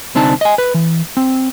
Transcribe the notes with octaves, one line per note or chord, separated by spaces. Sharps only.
C2 D3 C4 D4 D#4 A5
D#5 G#5
B4
E3
C4